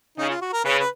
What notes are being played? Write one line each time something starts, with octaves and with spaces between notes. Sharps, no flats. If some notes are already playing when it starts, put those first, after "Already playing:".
C#3 D#4
F4
F#4
A#4
C#3 B4
B4